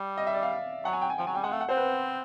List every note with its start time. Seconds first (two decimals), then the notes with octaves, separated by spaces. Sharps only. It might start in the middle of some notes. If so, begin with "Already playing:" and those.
Already playing: G3
0.18 D#5
0.27 E5
0.34 D5
0.43 F5
0.85 F#3 F#5
0.93 G#5
1.01 G5
1.10 G#5
1.18 F3 G5
1.27 F#3 G#5
1.35 G3 G5
1.44 G#3 F#5
1.51 A3 F5
1.61 F#5
1.69 C4 C5
1.77 B4